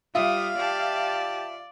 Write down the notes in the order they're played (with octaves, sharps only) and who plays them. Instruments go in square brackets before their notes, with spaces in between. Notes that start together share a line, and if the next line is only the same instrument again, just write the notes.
[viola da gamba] G3 [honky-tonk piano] F4 E5 [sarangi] F5 [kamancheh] D#6
[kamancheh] G4 A5 [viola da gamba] D5